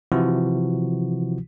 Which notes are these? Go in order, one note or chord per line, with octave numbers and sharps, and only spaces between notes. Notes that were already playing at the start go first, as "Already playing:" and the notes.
C3 E3 F3 E4 F#4